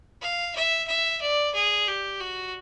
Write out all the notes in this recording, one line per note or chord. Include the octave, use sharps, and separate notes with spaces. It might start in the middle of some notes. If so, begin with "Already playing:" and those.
F5
E5
E5
D5
G#4
G4
F#4